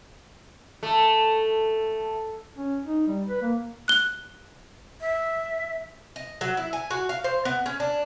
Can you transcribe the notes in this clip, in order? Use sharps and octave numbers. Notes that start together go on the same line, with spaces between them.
A3
C#4
D#4
G3
B4
A#3
F#6 G7
E5
D#5
F#3
E4
G#5
F#4
F5
C5
B3
C#4
D4